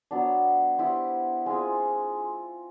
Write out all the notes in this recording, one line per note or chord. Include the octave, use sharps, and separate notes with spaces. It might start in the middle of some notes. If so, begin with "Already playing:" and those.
F#3 B3 D4
B3 E4 G4 C5
G#3 C4 F4 G#4